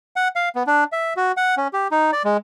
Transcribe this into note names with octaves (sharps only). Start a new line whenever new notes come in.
F#5
F5
B3
D4
E5
F#4
F#5
C#4
G4
D#4
D5
G#3